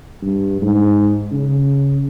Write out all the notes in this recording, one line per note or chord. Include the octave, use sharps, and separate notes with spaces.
G2
G#2
C#3